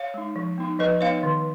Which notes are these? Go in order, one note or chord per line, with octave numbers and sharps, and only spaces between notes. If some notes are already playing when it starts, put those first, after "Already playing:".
Already playing: C#5 F5
G#3 D#4
F3
B3 D#4
F3 B4 D#5
B3 D#4 C#5 F5
D#3